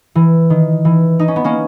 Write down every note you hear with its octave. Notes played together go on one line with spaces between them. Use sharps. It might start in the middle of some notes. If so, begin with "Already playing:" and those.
E3
D#3
E3
D#4
C#4
B3
A#3 C#4